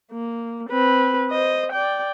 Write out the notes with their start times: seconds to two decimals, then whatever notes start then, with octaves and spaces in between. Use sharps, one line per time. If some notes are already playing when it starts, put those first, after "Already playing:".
0.12 A#3
0.70 C4 B4
1.30 C5 D#5
1.72 D5 G5